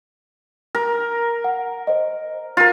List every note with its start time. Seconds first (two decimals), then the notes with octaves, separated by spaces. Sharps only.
0.75 A#4
1.44 F#5
1.87 C5 D#5
2.57 F4 A#4